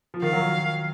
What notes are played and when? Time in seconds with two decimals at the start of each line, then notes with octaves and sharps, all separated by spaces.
0.14 F3
0.22 D#3 F5
0.33 F#3